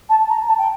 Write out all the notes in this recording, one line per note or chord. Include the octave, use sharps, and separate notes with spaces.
A5
A#5
A5
G5